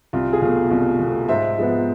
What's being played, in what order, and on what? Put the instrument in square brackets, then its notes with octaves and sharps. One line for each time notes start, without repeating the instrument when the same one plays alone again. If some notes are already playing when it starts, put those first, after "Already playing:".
[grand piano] C2 F4
G#4
B2 A3 F4
C2 F4
B2 A3
G#2 C5 E5
F3 G#3 B3